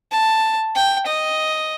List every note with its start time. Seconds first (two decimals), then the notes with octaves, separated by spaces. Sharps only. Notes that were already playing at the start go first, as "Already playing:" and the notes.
0.12 A5
0.75 G5
1.07 D#5